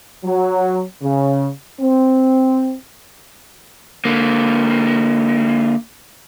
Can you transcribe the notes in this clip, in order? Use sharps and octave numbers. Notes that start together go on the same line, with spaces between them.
F#3
C#3
C4
D3 A#3